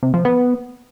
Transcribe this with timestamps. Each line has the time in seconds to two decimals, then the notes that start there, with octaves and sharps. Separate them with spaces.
0.03 C3
0.14 F3
0.25 B3